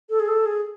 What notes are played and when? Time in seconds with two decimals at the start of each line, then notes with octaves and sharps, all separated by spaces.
0.10 A4
0.20 G#4
0.28 A4
0.46 G#4